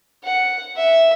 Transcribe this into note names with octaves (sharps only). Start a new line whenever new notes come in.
F#5
E5